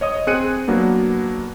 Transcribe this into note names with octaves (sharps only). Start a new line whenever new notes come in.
C#5 D#5 D#6
C4 G#4 F#6 C#7 D#7
F#3 A#3 B3 D4